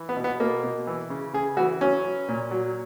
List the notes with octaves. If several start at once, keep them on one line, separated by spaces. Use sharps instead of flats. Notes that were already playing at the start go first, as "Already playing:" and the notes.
Already playing: E3
B3
B2
B3
B2 A#3
B2
E3
C#3
C#3 G#4
E3 F#4
F#3 C#4
F#3
A#2
F#3